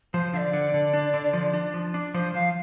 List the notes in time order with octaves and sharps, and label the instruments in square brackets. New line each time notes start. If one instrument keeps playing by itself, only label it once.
[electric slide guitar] F3 [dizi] C5
[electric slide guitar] D3 [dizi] D5 F5
[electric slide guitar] D3
D3
D4
D3
F3
D4
F3
D4
[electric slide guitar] F3 [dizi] C5
[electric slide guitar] F3 [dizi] F5